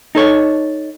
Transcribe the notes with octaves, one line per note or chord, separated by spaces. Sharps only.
D#4 A4 C#5